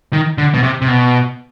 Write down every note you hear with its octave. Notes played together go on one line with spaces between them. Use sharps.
D#3
D3
B2
C3
C3
B2